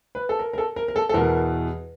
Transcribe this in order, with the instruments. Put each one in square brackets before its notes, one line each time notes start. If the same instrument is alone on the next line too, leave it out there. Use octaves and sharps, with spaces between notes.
[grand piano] B4
A4
A#4
A#4
A4
A#4
A#4
A4
A4
E2 B2 A#4